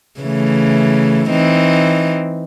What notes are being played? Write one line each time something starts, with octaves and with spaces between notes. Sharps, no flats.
C#3 E3 A3
E3 C4 D#4